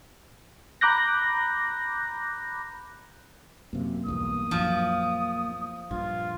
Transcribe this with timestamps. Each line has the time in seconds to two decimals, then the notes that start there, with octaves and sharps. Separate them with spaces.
0.81 A#5 B5 D6 F#6 G6 A#6
3.73 F#2 C3 A#3
4.06 B1 E2 G2 D#6
4.51 A#1 F#2 F3
5.91 A#1 G2 F4 G#6 A6